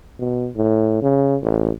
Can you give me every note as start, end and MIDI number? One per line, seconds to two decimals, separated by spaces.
0.20 0.49 47
0.56 1.00 45
1.02 1.37 49
1.42 1.71 33